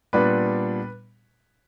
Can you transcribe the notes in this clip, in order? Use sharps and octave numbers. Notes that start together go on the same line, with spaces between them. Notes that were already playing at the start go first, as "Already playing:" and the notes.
A#2 G3 B3 D4 B4 B5